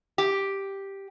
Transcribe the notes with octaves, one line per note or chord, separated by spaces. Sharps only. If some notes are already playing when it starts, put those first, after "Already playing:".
G4